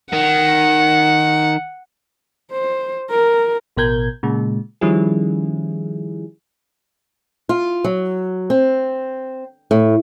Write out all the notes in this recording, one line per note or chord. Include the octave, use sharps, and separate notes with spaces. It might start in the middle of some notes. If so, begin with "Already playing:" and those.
D#3 F#5
C5
A#4
A1 B2 A#4 G6 G#6
A#2 C#3 G#3
D#3 F3 G3 C#4 E4 G#4
F4
F#3
C4
A2